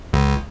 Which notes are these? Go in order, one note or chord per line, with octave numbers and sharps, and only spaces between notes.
C#2